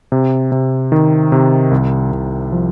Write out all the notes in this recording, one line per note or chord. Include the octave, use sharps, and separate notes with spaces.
C3
C3
D#3
C3
C2
C2
F3